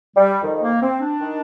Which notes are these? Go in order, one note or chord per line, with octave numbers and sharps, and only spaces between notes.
G3
F2 D#3
A#3
C4
D4
D#3